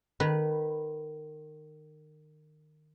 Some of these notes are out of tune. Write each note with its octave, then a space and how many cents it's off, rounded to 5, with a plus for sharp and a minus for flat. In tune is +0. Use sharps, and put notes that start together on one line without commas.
D#3 -25 B4 -10